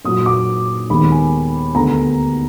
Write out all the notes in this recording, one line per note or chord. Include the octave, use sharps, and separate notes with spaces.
A#2 F#3 A#3 D#6
D6
D#2 D#3 G#3 B3 B5
G#5
D2 D3 G#3 B3 A#5